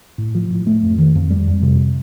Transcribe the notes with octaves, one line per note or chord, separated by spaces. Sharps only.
A2
F3
A2
A3
F2
D#3
F2
G3
F2
C3